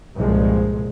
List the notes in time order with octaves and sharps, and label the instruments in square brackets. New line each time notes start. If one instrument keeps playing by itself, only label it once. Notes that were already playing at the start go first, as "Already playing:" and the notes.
[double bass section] C2 G2 A#2 F3 G#3